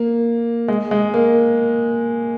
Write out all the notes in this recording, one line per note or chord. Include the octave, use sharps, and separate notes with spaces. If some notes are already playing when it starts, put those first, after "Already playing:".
Already playing: A#3
G#3
G#3
A#3